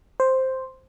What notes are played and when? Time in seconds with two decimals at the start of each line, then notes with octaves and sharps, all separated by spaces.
0.20 C5